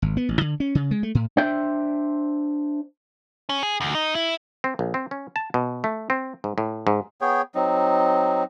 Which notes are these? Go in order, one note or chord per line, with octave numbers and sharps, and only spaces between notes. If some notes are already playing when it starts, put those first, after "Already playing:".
G#1
B3
A1
D3
C#4
C#3
G#3
A3
A2
D4 C5 E5 G5
C#4
G#4
D2
D#4
E4
C4
A#1
C4
C#4
A5
B2
A3
C4
G#2
A2
G#2
B3 G#4 C#5 G5
F#3 C4 D#4